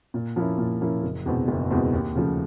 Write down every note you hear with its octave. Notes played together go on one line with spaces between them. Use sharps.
A#2
F3 A#3 C#4 E4
A#2
F3 A#3 C#4 E4
F#1
E2 B2 G#3 C4
F#1
E2 B2 G#3 C4
D#2
C#3 F3 A3